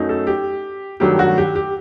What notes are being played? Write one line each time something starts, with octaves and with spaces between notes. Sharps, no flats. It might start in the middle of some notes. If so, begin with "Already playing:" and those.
Already playing: F#2 F#3 A3 D#4
A4
G4
G2 D#3 F#3 A3 G4
F#4
G4
G4